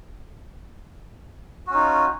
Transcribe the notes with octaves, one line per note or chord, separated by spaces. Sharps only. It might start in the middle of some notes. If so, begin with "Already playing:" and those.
C#4 D#4 F4 F#4